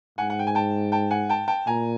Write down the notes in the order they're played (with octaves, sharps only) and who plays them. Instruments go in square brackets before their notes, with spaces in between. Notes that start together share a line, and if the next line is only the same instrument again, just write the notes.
[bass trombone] G#2 [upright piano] F#5 G#5
[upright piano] F#5
G5
G#5
G5 A5
G5 A5
F#5 G#5
G5 A5
G5 A5
[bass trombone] A#2 [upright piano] G#5 A#5